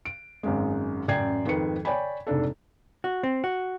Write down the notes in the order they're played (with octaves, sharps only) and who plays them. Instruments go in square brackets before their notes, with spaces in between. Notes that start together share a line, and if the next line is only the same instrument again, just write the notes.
[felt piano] D7
G#1 F#2 G#3
A1 F#2 D5 G5 G#6 C7
F2 G#2 D#3 B4 C#7
C#5 D5 G5 G#5 B5
F1 G#2 D4 A4
[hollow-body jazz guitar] F#4
C4
F#4